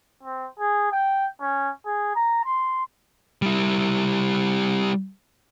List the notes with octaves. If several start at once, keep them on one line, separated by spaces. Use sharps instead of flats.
C4
G#4
G5
C#4
G#4
A#5
C6
G3 E4